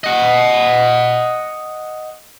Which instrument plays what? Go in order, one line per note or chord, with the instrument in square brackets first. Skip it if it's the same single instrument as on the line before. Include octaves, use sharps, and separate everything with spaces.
[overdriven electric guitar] D#5 F#5